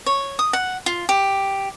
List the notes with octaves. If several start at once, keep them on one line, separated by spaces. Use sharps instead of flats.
C#5
D#6
F#5
F4
G4